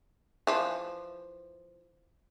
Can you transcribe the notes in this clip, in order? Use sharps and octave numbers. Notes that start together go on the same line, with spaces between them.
E3 F3